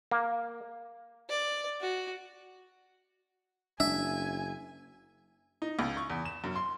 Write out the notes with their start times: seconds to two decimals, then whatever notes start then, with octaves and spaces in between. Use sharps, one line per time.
0.11 A#3
1.29 D5
1.81 F#4
3.80 F#1 D4 E5 G#5
5.62 D#4
5.79 C#2
5.97 C#6
6.10 E2
6.25 E7
6.44 F#2
6.56 C6